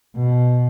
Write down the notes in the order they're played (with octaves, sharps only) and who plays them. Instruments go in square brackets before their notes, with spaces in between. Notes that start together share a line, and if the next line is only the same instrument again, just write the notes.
[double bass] B2